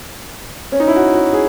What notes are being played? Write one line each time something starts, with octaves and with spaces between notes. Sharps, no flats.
C#4
D#4
E4
F#4
F#4
G#4